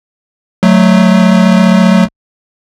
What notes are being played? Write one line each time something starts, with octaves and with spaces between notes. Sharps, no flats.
F#3 A3